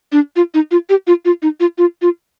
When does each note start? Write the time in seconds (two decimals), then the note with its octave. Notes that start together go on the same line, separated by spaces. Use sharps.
0.12 D4
0.36 F4
0.54 D#4
0.71 F4
0.89 G4
1.07 F4
1.25 F4
1.42 D#4
1.60 F4
1.78 F4
2.02 F4